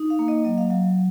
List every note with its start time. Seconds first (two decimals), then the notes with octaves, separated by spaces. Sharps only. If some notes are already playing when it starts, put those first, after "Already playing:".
Already playing: D#4
0.10 F5
0.19 A#3
0.28 D#5
0.45 F#3 D#5
0.58 F5
0.70 F#3 F5